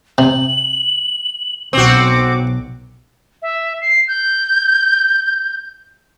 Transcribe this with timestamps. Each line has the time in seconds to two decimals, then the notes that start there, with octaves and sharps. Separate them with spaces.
0.18 C3 F#7
1.73 B1 C4 F#4 D6
3.42 E5
3.81 C7
4.08 G6